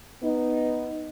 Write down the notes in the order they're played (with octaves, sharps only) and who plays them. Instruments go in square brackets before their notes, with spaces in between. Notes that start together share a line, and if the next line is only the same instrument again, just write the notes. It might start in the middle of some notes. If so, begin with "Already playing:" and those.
[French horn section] B3 D#4